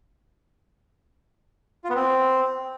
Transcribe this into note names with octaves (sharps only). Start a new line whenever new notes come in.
F4
B3
C4